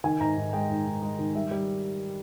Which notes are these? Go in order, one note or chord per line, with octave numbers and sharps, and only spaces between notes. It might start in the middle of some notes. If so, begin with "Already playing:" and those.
D#3 G#5
G#2 A#5
G#2
G#3 G5
G#2
G#2
G#3
D#3
G3 E5
G3